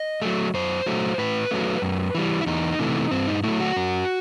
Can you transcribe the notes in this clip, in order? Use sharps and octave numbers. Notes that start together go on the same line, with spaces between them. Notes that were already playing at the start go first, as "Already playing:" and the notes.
Already playing: D#5
F#3 A3
F#2 C5
F#3 A3
A2 B4
F#3 A3
F#2
E3 G3
E4
E2 D#4
C3 E3 A3
G2 C4
D#4
F#3 A3 E4
F#4
F#2